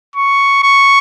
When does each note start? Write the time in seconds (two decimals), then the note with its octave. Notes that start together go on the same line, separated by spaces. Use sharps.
0.16 C#6
0.64 C#6